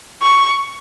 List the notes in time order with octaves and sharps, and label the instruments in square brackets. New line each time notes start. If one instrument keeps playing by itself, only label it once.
[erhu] C#6